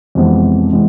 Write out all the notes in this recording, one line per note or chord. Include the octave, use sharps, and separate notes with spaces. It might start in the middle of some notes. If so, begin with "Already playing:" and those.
F2 C3 E3 G#3 B3
C3 E3 G#3 B3